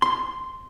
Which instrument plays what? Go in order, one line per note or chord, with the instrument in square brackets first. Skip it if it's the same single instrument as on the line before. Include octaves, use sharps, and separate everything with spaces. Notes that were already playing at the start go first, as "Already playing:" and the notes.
[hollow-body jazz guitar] C6